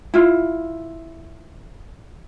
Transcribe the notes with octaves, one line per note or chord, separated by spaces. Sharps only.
E4 F4